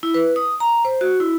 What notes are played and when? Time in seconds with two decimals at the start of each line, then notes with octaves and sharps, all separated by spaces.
0.03 E4
0.14 B4
0.36 D#6
0.60 A#5
0.85 C5
1.01 F#4
1.20 E4